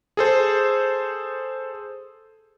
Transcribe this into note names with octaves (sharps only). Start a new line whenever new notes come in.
G#4 A4 C5